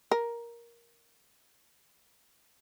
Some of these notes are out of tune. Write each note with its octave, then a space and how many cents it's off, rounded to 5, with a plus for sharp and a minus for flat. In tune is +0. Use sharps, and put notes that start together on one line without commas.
A#4 +10